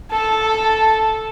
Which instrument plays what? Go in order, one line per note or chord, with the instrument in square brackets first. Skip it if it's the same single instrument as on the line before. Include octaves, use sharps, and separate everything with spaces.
[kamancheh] A4 A5